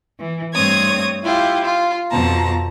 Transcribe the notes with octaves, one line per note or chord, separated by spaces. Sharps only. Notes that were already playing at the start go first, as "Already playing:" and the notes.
E3
G2 A3 C4 C#5 D#6 G#6
E4 F4 G4
F4
F2 B2 A5 A#5